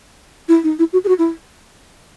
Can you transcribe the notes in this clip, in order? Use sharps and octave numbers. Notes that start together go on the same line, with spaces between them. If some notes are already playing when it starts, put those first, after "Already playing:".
E4
D#4
E4
F#4
G#4
F#4
E4